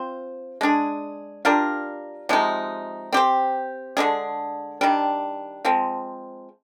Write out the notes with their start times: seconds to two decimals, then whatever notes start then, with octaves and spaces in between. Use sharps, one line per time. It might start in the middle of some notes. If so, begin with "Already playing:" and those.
Already playing: C4 F4 C5
0.61 G#3 D4 G#4
1.45 G3 D4 F4 A#4
2.29 C3 F3 G#3 D#4
3.13 C4 G4 C5
3.97 D3 G#3 D4 G#4
4.81 D#3 G3 D4
5.65 F3 G#3 C4